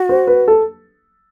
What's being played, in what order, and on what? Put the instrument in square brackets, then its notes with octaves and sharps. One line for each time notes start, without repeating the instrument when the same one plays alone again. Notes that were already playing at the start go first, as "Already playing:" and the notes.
Already playing: [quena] F#4
[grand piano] C5
B4
A4